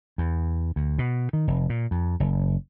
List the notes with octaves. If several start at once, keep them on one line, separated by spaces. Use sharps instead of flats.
E2
D2
B2
D#3
F1
A#2
F2
F#1